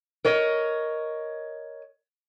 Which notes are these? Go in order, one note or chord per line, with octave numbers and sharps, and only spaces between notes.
A#4 C#5 D#5